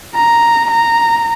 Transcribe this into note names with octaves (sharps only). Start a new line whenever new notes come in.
A#5
A#5